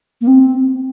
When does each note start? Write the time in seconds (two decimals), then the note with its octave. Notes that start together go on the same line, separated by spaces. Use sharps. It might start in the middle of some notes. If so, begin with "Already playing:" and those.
0.21 A#3
0.27 C4